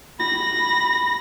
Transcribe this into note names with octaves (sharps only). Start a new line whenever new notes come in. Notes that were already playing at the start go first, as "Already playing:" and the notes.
B5 A#6